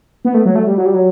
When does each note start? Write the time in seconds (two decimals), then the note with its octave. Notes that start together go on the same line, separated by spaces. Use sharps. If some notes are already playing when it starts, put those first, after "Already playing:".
0.25 B3
0.34 A3
0.45 F#3
0.55 A3
0.67 G3
0.77 F#3
0.86 G3
0.94 F#3